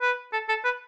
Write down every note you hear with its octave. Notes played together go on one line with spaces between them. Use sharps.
B4
A4
A4
B4